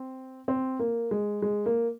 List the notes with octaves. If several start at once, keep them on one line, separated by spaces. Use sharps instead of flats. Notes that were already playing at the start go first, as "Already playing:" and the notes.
Already playing: C4
C4
A#3
G#3
G#3
A#3